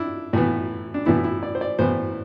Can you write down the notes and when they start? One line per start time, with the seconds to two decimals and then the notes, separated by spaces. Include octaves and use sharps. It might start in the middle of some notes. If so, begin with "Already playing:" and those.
Already playing: D4 E4
0.33 A2 E3 B3
0.94 D4
1.06 A2 E3 B3 E4
1.24 E4
1.43 D5
1.55 C5
1.61 D5
1.79 A2 E3 B3 C5